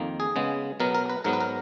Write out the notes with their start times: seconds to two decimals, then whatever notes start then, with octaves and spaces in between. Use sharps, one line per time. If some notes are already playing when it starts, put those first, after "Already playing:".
Already playing: F2 D#3 A#3
0.20 G#4
0.36 C#3 G#3 B3
0.80 B2 F#3 B3 A#4
0.94 A#4
1.09 B4
1.24 G#2 F#3 B3 A#4
1.33 B4
1.40 A#4